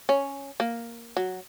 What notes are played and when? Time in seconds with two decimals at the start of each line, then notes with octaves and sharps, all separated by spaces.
0.09 C#4
0.60 A#3
1.17 F#3